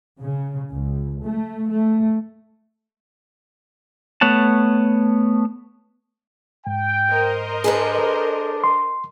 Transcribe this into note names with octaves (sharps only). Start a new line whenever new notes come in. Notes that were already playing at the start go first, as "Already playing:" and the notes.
C#3
C#2
A3
A3
A3 B3 C#5 F#5 A5
G#2 G5
A#4 C5 D#5
D4 G#4 A4 B4
C6